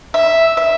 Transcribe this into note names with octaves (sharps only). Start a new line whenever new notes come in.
E5
E5